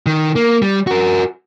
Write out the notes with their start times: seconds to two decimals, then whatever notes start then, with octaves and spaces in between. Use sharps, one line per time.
0.06 D#3
0.36 A#3
0.62 G3
0.87 F#4 A#4